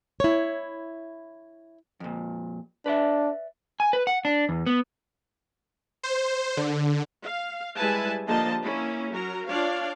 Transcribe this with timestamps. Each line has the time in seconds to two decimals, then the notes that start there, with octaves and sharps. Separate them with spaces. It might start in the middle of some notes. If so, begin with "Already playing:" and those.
0.20 E4 C#5
2.00 F2 A#2
2.86 D4 B4 D5 E5
3.80 G#5
3.93 B4
4.07 F#5
4.25 D4
4.49 E2
4.67 B3
6.03 C5
6.57 D3
7.23 F5
7.76 G3 G#3 E4 B4 G#5 A5
8.27 D3 F3 A#3 G4 D#5 A5
8.61 A#3 C#4 E4
9.11 F#3 A#4 A#5
9.48 D4 F4 C#5 D5 F5